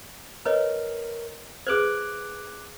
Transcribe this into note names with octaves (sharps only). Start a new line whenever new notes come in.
A#4 B4 C#5 D#5
G#4 B4 C5 D6 F#6 G#6